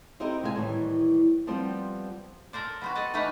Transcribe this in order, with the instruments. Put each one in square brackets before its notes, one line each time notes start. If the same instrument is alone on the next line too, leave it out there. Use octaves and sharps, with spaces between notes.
[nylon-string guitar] C4 D#4 E4 G4 A4 A#4
C3 G#3 F4 D#5 G#5 A5
A2 D#3 E3 G3
F3 G3 B3 C4 F4 G4
[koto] A4 A#4 C5 D5
B3 C4 F#4
A4 D5 D#5 A5
E3 A3 A#3 D#4 B4 D#5